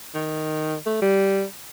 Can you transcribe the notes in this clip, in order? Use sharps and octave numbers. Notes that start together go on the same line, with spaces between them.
D#3
A3
G3